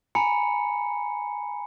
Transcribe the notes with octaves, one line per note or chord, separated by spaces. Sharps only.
G#5 A#5 B5 C#7